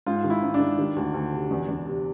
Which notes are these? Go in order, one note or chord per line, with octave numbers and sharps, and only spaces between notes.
G#2 F4
D#3
E4
G#2
D4
D#3
D#3
D2
D2
C3
E2
E2
C3